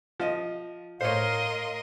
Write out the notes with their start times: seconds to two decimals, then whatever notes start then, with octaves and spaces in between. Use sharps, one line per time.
0.20 F3 D#5
1.01 A2 A#4 C5 C#5 D#5 F5 C6